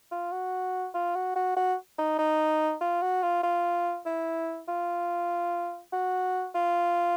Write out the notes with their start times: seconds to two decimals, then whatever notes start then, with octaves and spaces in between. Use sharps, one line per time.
0.12 F4
0.32 F#4
0.94 F4
1.15 F#4
1.36 F#4
1.57 F#4
1.99 D#4
2.19 D#4
2.81 F4
3.02 F#4
3.23 F4
3.43 F4
4.06 E4
4.68 F4
5.93 F#4
6.55 F4